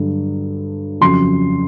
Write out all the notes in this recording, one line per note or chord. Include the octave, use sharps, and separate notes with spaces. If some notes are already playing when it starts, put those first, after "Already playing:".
Already playing: G2 D3 F#3
F2 C#3 F#3 C6